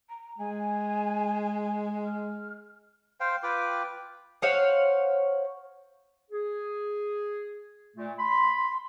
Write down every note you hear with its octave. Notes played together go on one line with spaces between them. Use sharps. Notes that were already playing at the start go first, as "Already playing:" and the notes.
A#5
G#3 G#5
F6
C5 F5 G5
F4 B4 G5 D6
C5 C#5 F5 F#5
G#4
A#2 A3
B5 C6